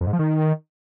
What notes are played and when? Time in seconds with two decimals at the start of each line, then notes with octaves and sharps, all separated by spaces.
0.01 F2
0.07 G#2
0.13 F3
0.19 D#3